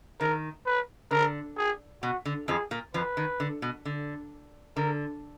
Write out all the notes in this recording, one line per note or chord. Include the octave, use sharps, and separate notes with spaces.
D#3 A#4
B4
D3 A#4
G#4
B2 F#4
D3
F2 F3 G#4
A#2 A#3
F2 F3 B4
D#3
D3
B2
D3
D3 A#4